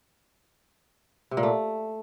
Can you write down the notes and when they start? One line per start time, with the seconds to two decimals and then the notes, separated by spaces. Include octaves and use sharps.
1.31 C3
1.37 A#2
1.43 A3